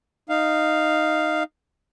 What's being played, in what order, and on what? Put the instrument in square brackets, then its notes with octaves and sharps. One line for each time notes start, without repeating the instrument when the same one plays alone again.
[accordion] D#4 F5